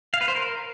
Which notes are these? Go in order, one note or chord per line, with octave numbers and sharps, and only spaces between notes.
F5
B4
C5
A#4